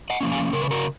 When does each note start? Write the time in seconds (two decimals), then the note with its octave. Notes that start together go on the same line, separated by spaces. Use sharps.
0.10 D#5 F#5
0.21 F3 A#3 C#4
0.32 F5 G#5
0.53 C#3 A#4
0.62 B4
0.71 F#4 A#4